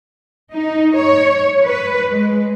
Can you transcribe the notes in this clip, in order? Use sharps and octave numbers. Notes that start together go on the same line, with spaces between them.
D#4
C#5
B4
G#3